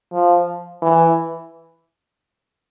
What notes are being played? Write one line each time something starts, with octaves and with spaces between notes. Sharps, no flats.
F3
E3